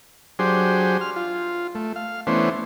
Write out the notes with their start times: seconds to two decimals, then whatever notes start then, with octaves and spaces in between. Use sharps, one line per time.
0.39 F#3 D4 G4 G#4 C5
1.01 F6
1.16 F4
1.75 A3
1.96 F5
2.27 E3 A3 B3 C#4 D4 C5